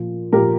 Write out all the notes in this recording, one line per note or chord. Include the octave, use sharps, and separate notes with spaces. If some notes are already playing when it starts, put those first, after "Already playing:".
Already playing: A#2 F3
A#2 F3 G4 A#4